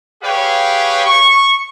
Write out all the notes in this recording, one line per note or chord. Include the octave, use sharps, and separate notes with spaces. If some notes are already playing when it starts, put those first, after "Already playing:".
G4 G#4 B4 C#5 F5 G5
C#6